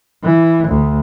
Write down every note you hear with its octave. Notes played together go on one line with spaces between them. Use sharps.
E3
D2